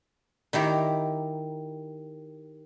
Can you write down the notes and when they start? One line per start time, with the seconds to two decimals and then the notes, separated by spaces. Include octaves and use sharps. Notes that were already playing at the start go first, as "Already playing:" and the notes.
0.53 D#3 E4 G4 A#5